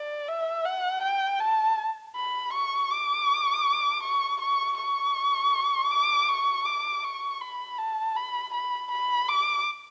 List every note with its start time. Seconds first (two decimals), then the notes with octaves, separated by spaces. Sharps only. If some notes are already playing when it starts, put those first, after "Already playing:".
Already playing: D5
0.28 E5
0.65 F#5
1.03 G5
1.40 A5
2.16 B5
2.53 C#6
2.91 D6
4.03 C#6
4.41 C#6
4.78 C#6
5.91 D6
6.29 C#6
6.66 D6
7.04 C#6
7.41 B5
7.79 A5
8.17 B5
8.54 B5
8.92 B5
9.29 D6